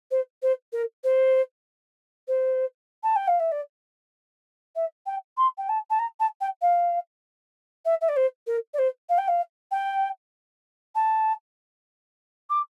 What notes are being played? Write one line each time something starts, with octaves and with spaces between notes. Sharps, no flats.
C5
C5
A#4
C5
C5
A5
G5
F5
E5
D5
E5
G5
C6
G5
A5
A5
A#5
A5
G5
F5
E5
E5
D5
C5
A#4
D5
C5
F5
G5
F5
G5
A5
D6